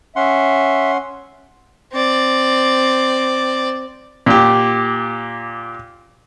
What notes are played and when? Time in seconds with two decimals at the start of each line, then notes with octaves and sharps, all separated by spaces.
0.16 C#4 E5 F#5 C6
1.93 C4 D5
4.26 A#2 G4